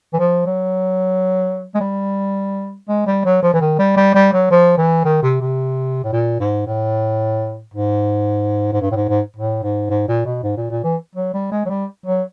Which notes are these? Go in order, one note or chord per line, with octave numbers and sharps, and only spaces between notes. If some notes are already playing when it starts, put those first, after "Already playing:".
E3
F3
F#3
G#3
G3
G#3
G3
F#3
F3
E3
D#3
G3
G3
G3
F#3
F3
E3
D#3
C3
C3
A2
A#2
G#2
A2
G#2
G#2
G2
A2
G#2
G#2
A2
G#2
G#2
A#2
B2
G#2
A#2
A#2
E3
F#3
G3
G#3
F#3
G3
F#3